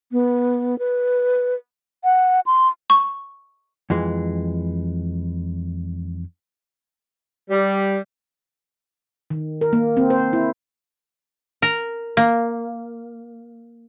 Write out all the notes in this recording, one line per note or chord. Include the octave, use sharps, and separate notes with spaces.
B3
B4
F#5
C6
C#6
F2 E3 G#3
G3
D#3
A#4
A#3
C4
C5
E4
A#4
A#3